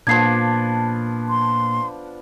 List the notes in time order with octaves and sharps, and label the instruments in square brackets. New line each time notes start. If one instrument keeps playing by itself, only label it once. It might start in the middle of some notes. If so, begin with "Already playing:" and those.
[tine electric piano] A#2 A#3 A5 [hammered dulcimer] F3 B3 D4 [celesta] G#6 C7
[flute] C6